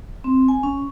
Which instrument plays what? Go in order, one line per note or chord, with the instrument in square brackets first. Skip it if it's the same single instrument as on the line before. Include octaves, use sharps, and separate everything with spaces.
[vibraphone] C4
G#5
C#4